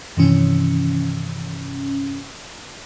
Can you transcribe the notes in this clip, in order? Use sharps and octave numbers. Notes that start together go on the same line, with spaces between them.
G2 C3 D#3 E3 C#4